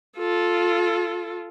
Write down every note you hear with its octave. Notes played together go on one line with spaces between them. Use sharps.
F4 A4